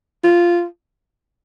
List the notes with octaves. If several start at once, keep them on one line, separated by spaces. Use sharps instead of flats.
F4